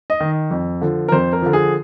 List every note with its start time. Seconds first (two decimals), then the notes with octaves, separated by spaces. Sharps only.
0.10 D#5
0.20 D#3
0.51 F2
0.81 D3 F3
1.08 A#4
1.12 F2 C5
1.33 A#4
1.42 D3 F3
1.53 G#4